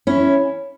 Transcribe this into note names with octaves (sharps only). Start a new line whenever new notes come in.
C#4 E4